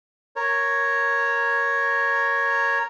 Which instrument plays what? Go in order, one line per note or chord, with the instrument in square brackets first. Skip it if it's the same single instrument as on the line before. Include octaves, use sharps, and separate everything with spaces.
[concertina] A#4 C#5